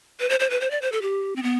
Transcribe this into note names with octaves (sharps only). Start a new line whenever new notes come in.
B4
C5
C5
B4
C5
D5
C5
A4
G4
C4
B3